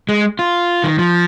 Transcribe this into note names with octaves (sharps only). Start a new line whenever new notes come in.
G#3
F4
D#3
F3